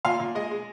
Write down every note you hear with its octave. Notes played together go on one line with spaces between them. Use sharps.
A#2 F5
A#2
G#3 D#5
G#3